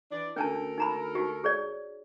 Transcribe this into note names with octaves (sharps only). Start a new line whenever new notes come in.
E3 D4 D5
D2 C#4 D4 A4 A#4 A5
D#4 A#5 B5
D#4 F#4 G4
G#4 C#5 D5